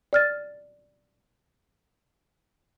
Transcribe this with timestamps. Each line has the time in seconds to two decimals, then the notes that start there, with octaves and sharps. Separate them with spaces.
0.13 D5 F6 A6